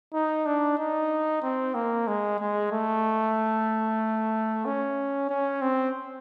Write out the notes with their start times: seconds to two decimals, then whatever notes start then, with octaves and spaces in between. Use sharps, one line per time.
0.14 D#4
0.46 D4
0.78 D#4
1.43 C4
1.74 A#3
2.07 G#3
2.40 G#3
2.72 A3
4.65 C#4
5.29 C#4
5.62 C4